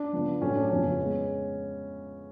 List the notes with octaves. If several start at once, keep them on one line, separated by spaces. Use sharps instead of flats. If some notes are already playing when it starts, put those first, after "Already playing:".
Already playing: D4
C#3 F3 B3
A2 F#3 A3 C#4
D4
F2 C#3 F3 B3 C#4
G#3 B3